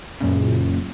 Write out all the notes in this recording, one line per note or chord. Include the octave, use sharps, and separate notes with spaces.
F#2 A#2 C#3